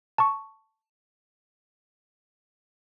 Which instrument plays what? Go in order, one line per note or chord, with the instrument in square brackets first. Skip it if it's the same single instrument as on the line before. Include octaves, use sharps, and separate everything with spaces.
[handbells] A5 C#6